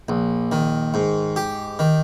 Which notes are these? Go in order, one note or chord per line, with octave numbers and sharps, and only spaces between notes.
A#1
D#3
G#2
G4
D#3